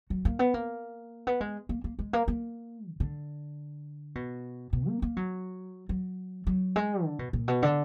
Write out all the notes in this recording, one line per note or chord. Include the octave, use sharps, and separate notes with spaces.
F#3
A#3
B3
A#3
B3
G#3
A#3
A#3
G#3
A#3
A#3
B2
D3
B2
B2
A#3
A#3
F#3
F#3
F#3
G#3
D3
B2
A#2
B2
D3